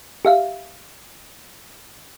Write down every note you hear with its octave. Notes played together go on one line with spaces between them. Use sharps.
G4 E5 F5